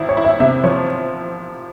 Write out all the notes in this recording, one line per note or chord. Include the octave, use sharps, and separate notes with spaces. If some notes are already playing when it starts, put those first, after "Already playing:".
Already playing: G#1 E4
C#5
E4
E5
C3 E5
F3 C#5